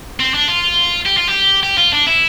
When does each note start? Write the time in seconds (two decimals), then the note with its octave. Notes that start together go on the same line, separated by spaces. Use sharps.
0.20 C4
0.34 D4
0.48 F4
1.06 G4
1.18 F4
1.29 G4
1.63 G4
1.78 F4
1.93 D4
2.07 E4